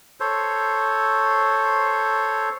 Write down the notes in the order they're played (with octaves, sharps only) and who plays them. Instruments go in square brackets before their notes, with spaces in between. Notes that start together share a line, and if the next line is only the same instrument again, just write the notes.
[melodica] A4 C5 C#5